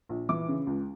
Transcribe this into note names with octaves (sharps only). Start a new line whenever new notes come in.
A#1
E3 D6
C#3
C#2